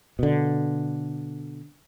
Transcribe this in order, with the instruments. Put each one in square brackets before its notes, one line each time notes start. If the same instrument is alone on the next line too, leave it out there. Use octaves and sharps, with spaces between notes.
[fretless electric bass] B2 D3